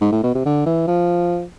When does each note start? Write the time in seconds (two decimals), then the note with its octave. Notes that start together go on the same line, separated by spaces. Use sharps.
0.01 G#2
0.12 A2
0.23 B2
0.35 C3
0.46 D3
0.66 E3
0.88 F3